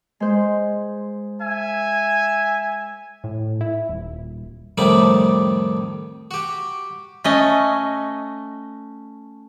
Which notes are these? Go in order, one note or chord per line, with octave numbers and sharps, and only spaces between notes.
G#3 C5
E5 G#5
A2
E4
D#1
F2 A2 D#3 G3 D5 E5
F#4 G4
A3 C#4 D#5